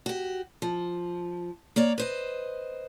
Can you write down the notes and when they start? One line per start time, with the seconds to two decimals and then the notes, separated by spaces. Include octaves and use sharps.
0.06 F#4 G4
0.62 F3
1.76 A#3 C#5 D5
1.98 B4 C5 D#5